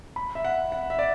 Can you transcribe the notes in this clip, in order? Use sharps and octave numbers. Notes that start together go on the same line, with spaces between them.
B5
E5
F#5
F#5
E5
D5